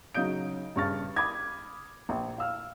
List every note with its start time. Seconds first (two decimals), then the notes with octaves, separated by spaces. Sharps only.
0.14 C#3 F#3 D#4 D#6 G6 D7
0.76 G2 C#3 C#6 F6 A6
1.16 B5 D6 D#6 G#6
2.09 A#1
2.38 F5 E6 F6